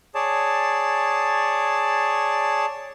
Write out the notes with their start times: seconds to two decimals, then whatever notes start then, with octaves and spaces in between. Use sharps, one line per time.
0.15 G#4 C#5 D5 A5